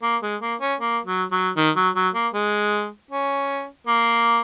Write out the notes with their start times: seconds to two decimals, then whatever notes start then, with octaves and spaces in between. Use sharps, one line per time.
0.03 A#3
0.23 G#3
0.41 A#3
0.61 C#4
0.80 A#3
1.05 F#3
1.31 F#3
1.57 D#3
1.76 F#3
1.95 F#3
2.14 A#3
2.33 G#3
3.11 C#4
3.87 A#3